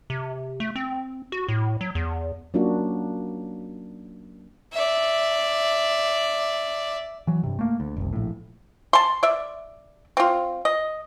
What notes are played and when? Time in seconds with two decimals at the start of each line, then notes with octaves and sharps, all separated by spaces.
0.10 C3
0.60 A3
0.76 C4
1.32 F#4
1.48 A2
1.81 F#3
1.95 E2
2.54 F#3 A#3 C#4 D4 F4 F#4
4.73 D5 E5
7.27 E3 F#3
7.43 G2 C3
7.59 A3 A#3
7.80 D2
7.97 F#1 C2
8.13 A#1 A2
8.93 A5 C6
9.23 D5 E5
10.17 C4 F4
10.65 D#5